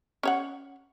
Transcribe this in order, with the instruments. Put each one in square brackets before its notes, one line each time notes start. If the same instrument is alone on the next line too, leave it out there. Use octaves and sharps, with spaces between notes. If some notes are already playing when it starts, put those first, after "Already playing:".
[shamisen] C#4 C#5 F#5